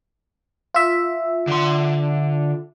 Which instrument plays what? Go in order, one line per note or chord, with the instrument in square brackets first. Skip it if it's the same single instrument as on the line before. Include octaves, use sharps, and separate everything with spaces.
[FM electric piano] F4 E5
[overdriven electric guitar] D3 C6